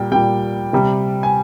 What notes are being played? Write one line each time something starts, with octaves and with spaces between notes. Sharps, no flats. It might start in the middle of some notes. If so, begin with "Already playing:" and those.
Already playing: A#2 G3 G5
A#2 G3 G5
C3 G3
G#5